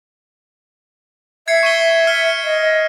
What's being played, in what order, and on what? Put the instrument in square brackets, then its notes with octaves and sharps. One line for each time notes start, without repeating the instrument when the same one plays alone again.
[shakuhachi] E5 [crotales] G#6 C7 C#7
[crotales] C#6 D#7 G7
F6 C#7 G7
[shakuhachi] D#5